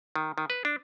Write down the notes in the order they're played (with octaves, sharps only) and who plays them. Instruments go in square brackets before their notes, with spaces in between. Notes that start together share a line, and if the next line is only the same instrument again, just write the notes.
[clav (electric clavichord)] D#3
D#3
B4
D4